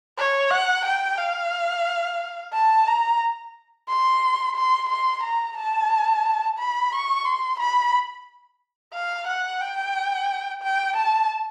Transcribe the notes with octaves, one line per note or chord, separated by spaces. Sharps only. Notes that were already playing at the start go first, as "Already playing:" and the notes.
C#5
F#5
G5
F5
A5
A#5
C6
C6
C6
A#5
A5
B5
C#6
C6
B5
F5
F#5
G5
G5
A5